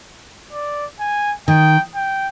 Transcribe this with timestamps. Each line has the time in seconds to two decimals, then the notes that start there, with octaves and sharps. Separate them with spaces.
0.53 D5
1.00 G#5
1.48 D#3 G5
1.95 G5